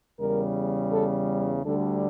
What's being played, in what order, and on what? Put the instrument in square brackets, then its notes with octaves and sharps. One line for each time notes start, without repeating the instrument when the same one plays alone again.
[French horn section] E2 C#3 G3 A#4
A4
D2 D3 G3 A4